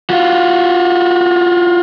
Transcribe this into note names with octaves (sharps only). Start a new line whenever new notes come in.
F4 F#4